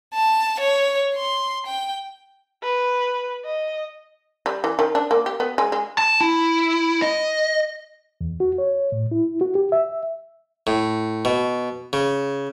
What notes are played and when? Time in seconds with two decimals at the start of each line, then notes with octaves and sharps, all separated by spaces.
0.14 A5
0.60 C#5
1.16 C6
1.66 G5
2.63 B4
3.45 D#5
4.46 G3
4.64 E3
4.79 D#3
4.95 D4
5.11 A#3
5.26 G4
5.40 B3
5.58 G#3
5.72 G#3
5.98 A5
6.21 E4
7.02 D#5
8.21 E2
8.40 F#4
8.58 C#5
8.92 A2
9.11 E4
9.41 F#4
9.55 G4
9.72 E5
10.67 A2
11.25 B2
11.93 C#3